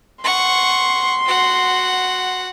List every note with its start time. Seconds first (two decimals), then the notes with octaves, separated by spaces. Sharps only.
0.24 F#5 C6 C#6
1.26 F#4 F#5